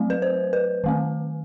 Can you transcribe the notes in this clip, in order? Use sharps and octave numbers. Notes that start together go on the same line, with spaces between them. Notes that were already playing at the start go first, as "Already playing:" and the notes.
Already playing: F#3 A3 C4
B4
C5
B4
D#3 A3 C4